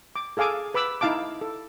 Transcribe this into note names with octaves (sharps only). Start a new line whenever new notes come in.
D6
G#4 A4 F5 G#5 D6
B4 B5 D6 E6
D#4 E4 F5 A5 D6
A4